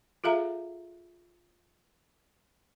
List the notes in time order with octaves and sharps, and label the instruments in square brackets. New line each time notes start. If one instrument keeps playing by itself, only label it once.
[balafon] F4 G#4 A4 E5 F5 A#5